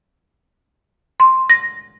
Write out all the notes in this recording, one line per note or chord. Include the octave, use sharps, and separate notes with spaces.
C6
A#6